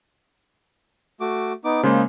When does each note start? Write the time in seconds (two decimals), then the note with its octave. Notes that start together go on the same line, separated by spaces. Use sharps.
1.20 A3 F#4 D6
1.64 B3 D#4 D6
1.83 C#3 G#3 A#3 C5